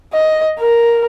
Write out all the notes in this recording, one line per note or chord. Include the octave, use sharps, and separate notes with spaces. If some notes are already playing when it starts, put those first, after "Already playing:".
D#5
A#4